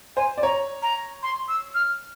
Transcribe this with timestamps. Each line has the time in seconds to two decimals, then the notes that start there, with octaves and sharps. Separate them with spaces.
0.16 C5 G#5
0.38 D5
0.43 C#5 A#5
0.82 A#5
1.23 C6
1.48 E6
1.75 F6